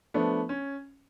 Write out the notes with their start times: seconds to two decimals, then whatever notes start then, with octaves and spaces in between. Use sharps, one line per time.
0.14 F3 A3 B3 D4
0.49 C#4